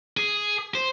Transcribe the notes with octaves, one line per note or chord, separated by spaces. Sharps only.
G#4
C5